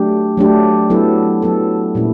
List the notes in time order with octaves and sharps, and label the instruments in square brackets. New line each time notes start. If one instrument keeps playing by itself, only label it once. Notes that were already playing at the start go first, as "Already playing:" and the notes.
Already playing: [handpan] F#3 A3 D4 G4
F#3 A3 D4 G4
F#3 B3 E4 A4
F#3 B3 E4 A4
A#2 G3 A#3 C#4 E4